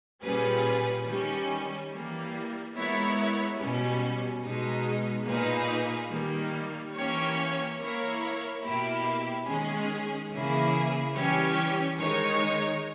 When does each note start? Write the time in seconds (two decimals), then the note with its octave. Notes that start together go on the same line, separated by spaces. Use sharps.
0.23 A#2 G3 C#4 G#4 B4
1.07 D#3 G3 C#4
1.91 E3 G3 A#3
2.76 G#3 B3 E4 A#4 C#5
3.59 B2 G3 C#4
4.44 B2 G#3 D#4
5.27 A#2 A#3 D#4 G#4 B4
6.11 D#3 G3 A#3
6.96 E3 A#3 C#4 G4 C#5
7.79 A#3 E4 A#4 C#5
8.63 B2 A#3 E4 G4
9.47 D#3 G#3 C#4 G#4
10.30 C#3 E3 A#3 E4 G#4
11.14 E3 G3 C#4 G4 C#5
11.99 D#3 G#3 D#4 A#4 C#5